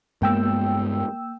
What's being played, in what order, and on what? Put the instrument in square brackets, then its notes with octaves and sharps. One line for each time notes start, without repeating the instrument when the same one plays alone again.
[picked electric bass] G2 G#3 B3 [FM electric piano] A#3 G5 E6